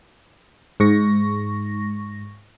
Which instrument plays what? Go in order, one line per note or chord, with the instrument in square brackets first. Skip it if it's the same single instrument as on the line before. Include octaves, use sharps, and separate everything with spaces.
[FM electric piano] G#2 C#6 A#6